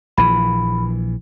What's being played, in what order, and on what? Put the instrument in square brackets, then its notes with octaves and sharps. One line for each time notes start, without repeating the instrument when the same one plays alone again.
[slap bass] A#1 E3 [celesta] B5